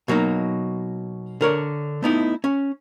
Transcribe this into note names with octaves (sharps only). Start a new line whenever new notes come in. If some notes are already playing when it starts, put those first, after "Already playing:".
B2 F#3 A#3 D#4
D3 A#4 C#5 D5
A3 B3 D#4 E4
C#4